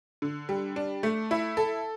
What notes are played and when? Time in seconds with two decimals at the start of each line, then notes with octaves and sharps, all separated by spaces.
0.22 D3
0.49 G3
0.76 D4
1.03 A3
1.31 E4
1.57 A4